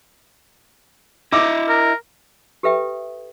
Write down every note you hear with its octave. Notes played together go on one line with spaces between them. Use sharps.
E4 D#5 E5 D6 E6
A#4
G4 A4 B4 E5 G5 D#6